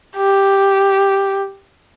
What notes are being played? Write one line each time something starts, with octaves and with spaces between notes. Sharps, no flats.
G4